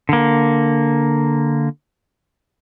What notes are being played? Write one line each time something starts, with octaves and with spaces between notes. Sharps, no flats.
D3 A#3